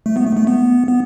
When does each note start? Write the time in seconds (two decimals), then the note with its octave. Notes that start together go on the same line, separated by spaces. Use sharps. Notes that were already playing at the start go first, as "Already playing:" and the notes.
0.06 A3
0.17 B3
0.26 A3
0.37 A3
0.47 B3
0.88 B3